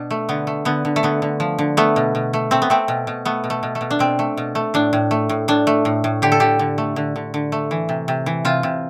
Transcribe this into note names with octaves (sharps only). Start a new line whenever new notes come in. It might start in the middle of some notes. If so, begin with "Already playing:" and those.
Already playing: B2 D4
A3
D3 B3
A3
D3 B3
D3
A3
D3 B3
D3
F3
D3
A3 B3
B2
B2
A3
A3 C4
B3
A3 C4
B2
B2
A3 B3
B2
A3
B2
A3
B2
D4
B2 C4
A3
B2
A3
A2 D4
A2
A3
A2
A2 D4
A3
A2
A2
D3 G4
A4
D3 G4
D3
A3
D3
D3
D3
A3
E3
C3
C3
E3
C3 F4
C3